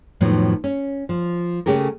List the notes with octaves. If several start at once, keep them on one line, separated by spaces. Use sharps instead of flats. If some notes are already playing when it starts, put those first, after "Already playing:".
F2 A2 D#3 F3 F#3 B3
C#4
F3
C#3 A3 C#4 G4 G#4 A#4